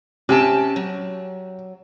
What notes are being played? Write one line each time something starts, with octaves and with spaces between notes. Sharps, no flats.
C3 C#4 G5 A5
F#3